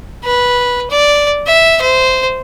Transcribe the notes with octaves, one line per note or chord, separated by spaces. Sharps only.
B4
D5
E5
C5